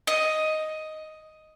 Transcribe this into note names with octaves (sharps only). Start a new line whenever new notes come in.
D#5